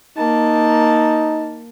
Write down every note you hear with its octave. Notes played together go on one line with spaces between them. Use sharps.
A#3 D#4 A5